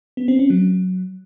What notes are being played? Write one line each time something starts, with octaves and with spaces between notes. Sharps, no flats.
B3
C4
C#4
F#3